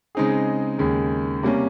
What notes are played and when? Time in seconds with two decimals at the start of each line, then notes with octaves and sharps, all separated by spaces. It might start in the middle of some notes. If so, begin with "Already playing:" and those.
0.15 C#3 G#3 C4 D#4 G#4
0.79 D#2 C#3 G#3
1.43 C3 G3 A#3 C#4